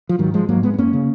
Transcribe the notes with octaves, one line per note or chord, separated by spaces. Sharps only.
F3
G#2 D#3 F#3
F3 G#3
G#2 F#3 A#3
G#3 B3
B3
F#2 A#3 C#4
C#3